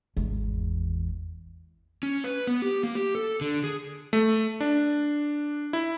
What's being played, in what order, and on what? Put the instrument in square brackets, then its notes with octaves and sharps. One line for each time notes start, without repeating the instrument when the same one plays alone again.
[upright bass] G#1 E2
[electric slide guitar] C#4
B4
B3
G4
A#3
G4
A4
D3
G#4
[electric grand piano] A3
D4
E4